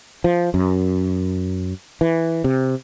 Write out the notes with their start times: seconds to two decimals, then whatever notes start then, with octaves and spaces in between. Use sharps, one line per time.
0.24 F3
0.54 F#2
2.01 E3
2.44 C3